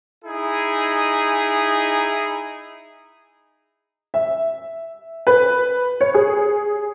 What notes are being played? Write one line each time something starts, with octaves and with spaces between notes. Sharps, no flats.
D#4 E4 G#4
E5
B4
C#5
G#4